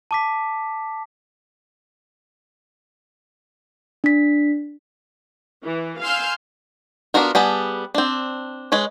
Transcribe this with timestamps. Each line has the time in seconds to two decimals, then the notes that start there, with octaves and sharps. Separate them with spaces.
0.11 A5 D6 B6
4.04 D4 B6
5.64 E3
6.01 F5 G#5 C6 E6 F6 G6
7.14 B3 D4 F4 F#4 A#4
7.35 G3 B3 G#4 A5
7.95 C4 D4
8.72 G#3 B4 C#5